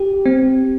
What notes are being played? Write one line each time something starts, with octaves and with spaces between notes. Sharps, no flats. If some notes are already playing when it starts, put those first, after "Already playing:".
Already playing: G4
C4